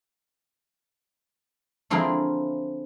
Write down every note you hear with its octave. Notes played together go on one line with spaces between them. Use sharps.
D3 F3 C4 E4 G#4 A#4